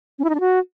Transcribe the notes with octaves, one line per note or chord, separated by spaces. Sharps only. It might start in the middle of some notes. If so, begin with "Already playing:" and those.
C#4
E4
D#4
D4
F#4